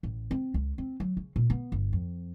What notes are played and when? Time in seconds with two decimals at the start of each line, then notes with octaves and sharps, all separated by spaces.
0.03 A1
0.31 C4
0.54 C#2
0.78 C4
1.00 F#3
1.17 C#3
1.36 A#2
1.50 B3
1.72 G1
1.93 F2